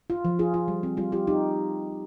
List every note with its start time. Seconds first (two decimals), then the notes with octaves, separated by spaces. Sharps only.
0.10 F4
0.25 F3
0.39 F4 G#4
0.54 F4
0.68 G3
0.83 C4
0.97 G3 F4
1.12 F4 G4
1.27 D#4 G4